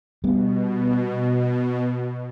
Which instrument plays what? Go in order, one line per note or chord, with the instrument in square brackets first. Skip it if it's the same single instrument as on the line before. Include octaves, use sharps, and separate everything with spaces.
[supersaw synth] B2 [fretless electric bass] G3 B3